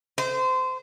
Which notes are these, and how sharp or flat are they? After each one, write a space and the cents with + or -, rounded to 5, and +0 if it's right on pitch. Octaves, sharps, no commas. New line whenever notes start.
C5 -25